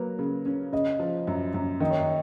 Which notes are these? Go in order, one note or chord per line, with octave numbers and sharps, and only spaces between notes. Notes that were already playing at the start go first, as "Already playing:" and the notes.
Already playing: F#3 A#3 B4
C#3
C#4
C#3 D#5
F3
F#2
F#2
D#3 D#5
C#5
D#5